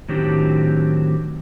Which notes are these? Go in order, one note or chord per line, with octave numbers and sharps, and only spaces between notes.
A2 D#3 F#3 C4 D4 G4